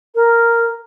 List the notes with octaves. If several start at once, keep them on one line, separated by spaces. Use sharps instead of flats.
A#4